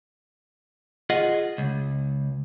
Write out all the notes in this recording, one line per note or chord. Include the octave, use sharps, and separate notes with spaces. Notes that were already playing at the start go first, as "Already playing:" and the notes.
F4 G#4 D#5 F#5
C#2